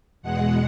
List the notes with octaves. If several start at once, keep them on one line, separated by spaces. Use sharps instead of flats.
E2 B2 G#3 F#5